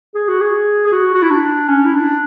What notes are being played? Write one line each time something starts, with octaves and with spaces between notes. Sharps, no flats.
G#4
F#4
G#4
G#4
F#4
F#4
E4
D4
C#4
E4
D4